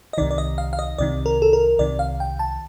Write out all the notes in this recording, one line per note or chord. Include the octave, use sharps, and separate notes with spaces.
D#5
C2 C3 D#3 D5
D5
D#5
F5
F5
D#5
C2 C3 D#3 D5
A#4
A4
A#4
C2 C3 D#3 D5
F5
G5
A5